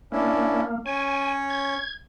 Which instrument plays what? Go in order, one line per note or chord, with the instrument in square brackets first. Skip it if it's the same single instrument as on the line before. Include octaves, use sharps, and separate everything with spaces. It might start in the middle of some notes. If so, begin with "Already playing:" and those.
[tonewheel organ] A#3 [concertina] C#4 D4 E4
[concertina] C#4 C#5 [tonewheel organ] G#5
[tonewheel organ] G#6